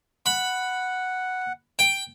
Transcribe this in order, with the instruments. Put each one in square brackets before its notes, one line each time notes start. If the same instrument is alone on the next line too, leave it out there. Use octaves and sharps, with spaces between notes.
[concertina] F#5 [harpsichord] B5
[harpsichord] G5